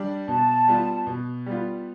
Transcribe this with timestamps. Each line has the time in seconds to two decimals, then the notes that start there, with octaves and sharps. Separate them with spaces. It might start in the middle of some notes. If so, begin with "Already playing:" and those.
Already playing: G3 D4
0.28 B2 A5
0.68 G3 B3 F4
1.07 B2
1.46 G3 B3 F4